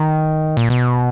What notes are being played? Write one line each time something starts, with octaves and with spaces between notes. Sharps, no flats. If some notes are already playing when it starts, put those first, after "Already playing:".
Already playing: D#3
A#2
B2